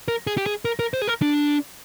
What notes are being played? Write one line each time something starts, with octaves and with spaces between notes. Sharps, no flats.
A#4
G#4
G4
G#4
A#4
A#4
C5
G#4
A#4
D4